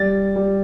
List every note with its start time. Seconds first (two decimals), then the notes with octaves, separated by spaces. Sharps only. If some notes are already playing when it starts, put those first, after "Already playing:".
Already playing: G3 A6
0.36 G3